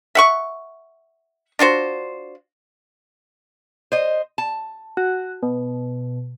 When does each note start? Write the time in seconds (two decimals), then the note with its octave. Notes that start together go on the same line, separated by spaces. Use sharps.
0.15 E5 F#5 C#6
1.59 D4 F4 F#4 C5
3.92 C5 D#5
4.38 A5
4.97 F#4
5.43 B2